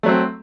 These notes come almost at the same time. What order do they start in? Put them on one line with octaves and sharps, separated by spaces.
A3 F#3 C4